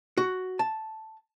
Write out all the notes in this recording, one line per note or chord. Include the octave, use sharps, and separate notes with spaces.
F#4
A5